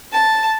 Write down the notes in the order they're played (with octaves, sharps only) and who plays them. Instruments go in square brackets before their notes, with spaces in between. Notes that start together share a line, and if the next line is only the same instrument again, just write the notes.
[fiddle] A5